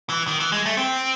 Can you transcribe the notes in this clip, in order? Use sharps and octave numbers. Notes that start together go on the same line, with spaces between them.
E3
D#3
E3
G#3
A3
C4